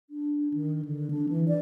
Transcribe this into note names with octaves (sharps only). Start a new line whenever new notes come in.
D4
D#3
D3
D4
E3
D5